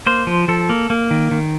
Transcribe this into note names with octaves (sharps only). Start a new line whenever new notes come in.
A#3 C5
F3
F3 A4
A#3
A#3
D#3
D#3